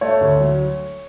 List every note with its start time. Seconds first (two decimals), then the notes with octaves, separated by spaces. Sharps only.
0.01 A3 C#5
0.21 D2
0.40 F#3